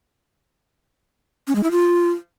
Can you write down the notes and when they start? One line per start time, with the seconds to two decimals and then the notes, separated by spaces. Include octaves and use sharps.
1.48 C#4
1.55 G#3
1.63 E4
1.71 F4